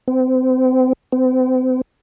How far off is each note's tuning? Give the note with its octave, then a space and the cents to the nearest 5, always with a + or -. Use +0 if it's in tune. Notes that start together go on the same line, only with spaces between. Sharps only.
C4 -30
C4 -35